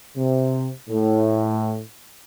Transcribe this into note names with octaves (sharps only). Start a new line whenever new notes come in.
C3
A2